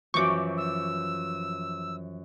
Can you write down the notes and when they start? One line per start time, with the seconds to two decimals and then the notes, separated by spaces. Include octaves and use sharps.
0.14 F#2 E3 F3 C#6 D6
0.57 E6